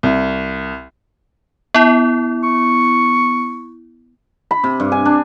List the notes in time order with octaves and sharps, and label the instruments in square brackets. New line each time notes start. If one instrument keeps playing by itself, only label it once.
[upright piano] C2
[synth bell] B3 E4
[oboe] C#6
[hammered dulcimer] B5
C3
G2
G#5
D4